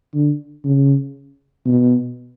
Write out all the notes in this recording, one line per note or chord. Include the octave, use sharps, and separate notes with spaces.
D3
C#3
B2